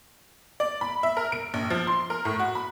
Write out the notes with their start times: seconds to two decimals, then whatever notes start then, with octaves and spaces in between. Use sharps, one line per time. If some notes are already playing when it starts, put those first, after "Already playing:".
0.60 D5
0.81 B5
1.03 E5
1.17 A#4
1.32 D7
1.54 A#1
1.70 F3
1.87 C6
2.10 A#4
2.25 A2
2.39 F#4
2.55 B5